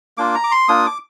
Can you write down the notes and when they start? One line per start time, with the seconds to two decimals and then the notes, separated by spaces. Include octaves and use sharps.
0.18 A#3 D4 F4 D6
0.35 A#5
0.44 D6
0.52 C6
0.68 A#3 D4 F4 D#6
0.86 D6